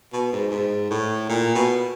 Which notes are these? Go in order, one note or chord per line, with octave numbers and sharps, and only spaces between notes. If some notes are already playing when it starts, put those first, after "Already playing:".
B2
G#2
G#2
A2
A#2
B2